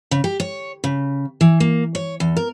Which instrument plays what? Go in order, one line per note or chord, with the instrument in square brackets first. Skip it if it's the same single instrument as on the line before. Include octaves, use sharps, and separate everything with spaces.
[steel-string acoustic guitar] C#3
G4
C#5
C#3
E3
A#3
C#5
E2
A#4